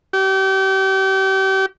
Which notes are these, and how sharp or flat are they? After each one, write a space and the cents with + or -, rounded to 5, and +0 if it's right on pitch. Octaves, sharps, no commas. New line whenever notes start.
G4 -35